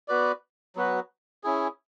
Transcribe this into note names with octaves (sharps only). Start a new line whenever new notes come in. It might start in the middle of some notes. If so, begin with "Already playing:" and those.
B3 F#4 B4 D5
F#3 B3 F#4 B4
C#4 E4 G#4